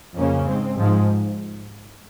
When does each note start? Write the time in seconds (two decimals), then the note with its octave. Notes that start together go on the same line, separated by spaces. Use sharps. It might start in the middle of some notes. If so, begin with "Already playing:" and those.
0.16 F2 C#3 A#3 C#4
0.46 G#2 G#3 C4
0.77 G#2 F3 G#3